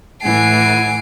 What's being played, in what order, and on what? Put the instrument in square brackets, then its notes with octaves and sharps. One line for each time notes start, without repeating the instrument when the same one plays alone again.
[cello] A2 E3 [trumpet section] F#5 G#5 [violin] C7 D7